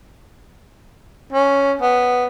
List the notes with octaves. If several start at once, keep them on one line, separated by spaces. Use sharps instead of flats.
C#4
B3